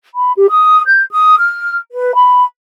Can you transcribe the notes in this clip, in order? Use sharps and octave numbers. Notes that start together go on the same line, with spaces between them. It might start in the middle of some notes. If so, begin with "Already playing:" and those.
B5
G4
D#6
G6
D#6
F6
B4
B5